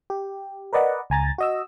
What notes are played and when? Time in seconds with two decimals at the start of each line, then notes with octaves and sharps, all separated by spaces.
0.10 G4
0.73 A#4 B4 D5 D#5 F#5
1.10 C#2 G#5 A#5 A6
1.38 F#4 D#5 E6